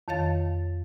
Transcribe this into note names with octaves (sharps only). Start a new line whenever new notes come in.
F2 D#3 C#5 F5 A6